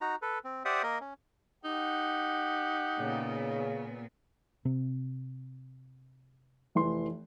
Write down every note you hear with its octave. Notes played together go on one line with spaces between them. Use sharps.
D#4 F#4 A#5
A4 B4
C4
G4 C5 D5 E5 F#5 D#6
A#3 A#4 D#5
C#4
D#4 G4 F#5
A#2 C#3 B3
C3 C4
F1 E3 C6